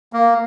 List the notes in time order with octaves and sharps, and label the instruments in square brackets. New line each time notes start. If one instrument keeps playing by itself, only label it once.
[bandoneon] A#3